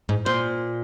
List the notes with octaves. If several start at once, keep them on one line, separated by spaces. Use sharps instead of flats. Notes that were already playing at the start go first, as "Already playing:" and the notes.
G#2
A#2 C5